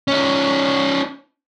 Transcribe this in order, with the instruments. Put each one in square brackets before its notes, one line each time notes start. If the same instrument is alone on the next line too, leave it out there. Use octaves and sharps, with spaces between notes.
[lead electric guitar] C#4 D#4